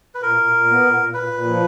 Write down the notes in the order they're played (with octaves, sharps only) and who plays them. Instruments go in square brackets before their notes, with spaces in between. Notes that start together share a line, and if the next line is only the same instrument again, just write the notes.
[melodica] B4
[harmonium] A#2 [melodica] A#4
[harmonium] A#2
A#2
B3
A#2
A#2
[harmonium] A#2 [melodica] B4
[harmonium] A#2
F3